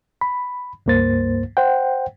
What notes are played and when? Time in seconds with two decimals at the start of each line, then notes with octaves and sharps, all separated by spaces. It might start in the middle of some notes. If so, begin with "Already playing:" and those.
0.21 B5
0.86 C#2 G2 A#3 C5 A6
1.57 C5 F#5 G5